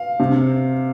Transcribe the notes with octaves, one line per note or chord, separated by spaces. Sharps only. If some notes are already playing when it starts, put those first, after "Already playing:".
Already playing: F5
C3